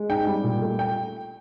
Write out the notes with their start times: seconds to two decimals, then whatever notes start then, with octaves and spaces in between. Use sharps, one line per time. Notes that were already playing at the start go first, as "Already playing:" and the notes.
Already playing: G#3
0.09 G#2 G5
0.27 G3
0.44 A#2
0.61 A3
0.79 G5